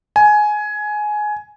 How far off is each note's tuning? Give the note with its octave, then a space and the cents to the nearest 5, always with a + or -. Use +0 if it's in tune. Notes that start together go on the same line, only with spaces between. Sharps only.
G#5 +15